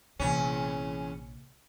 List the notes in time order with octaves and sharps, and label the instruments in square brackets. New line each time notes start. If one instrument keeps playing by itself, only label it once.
[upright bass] A#1 C3 [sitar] E2 C#4